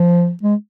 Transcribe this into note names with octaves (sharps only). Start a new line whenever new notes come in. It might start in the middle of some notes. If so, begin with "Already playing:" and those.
Already playing: F3
G#3